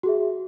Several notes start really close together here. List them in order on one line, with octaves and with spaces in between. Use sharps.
F#4 G#4 E5